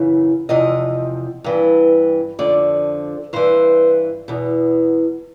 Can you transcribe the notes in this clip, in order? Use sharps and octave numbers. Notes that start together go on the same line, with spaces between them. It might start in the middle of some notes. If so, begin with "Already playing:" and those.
Already playing: F#2 C#3 E3
E2 C3 F3 D#5
G2 E3
F2 D3 F3 D5
G2 E3 C5
E2 B2